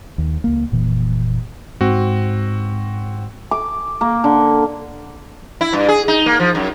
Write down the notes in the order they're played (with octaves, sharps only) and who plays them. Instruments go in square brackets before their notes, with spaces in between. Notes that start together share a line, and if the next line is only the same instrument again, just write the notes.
[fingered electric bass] D#2
C#2 A#3
F1 A#2 E3
[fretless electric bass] G#2 [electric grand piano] C4 F#4
[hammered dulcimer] D6
A#3
D3
[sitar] E4
G2
G#4
D#4
A#3
F3
F#2